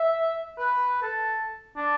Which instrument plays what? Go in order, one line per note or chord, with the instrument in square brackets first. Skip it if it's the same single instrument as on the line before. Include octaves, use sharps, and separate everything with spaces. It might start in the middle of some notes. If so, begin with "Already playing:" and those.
Already playing: [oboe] E5
B4
A4
D4